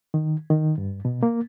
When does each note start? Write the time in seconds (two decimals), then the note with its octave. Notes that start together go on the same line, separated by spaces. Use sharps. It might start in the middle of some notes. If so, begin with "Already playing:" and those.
0.14 D#3
0.50 D#3
0.78 G2
1.05 B2
1.23 A#3